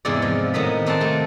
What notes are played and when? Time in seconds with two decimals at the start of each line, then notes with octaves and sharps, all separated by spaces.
0.05 E2 G#2 C3 B3 E4 D5
0.22 F3
0.54 A2 D#3 B3 A#4 D#5 B5
0.86 A#3 C4 F#5 A5
1.01 C3 A3